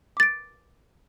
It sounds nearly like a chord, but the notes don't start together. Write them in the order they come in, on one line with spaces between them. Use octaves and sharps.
D6 A6 D7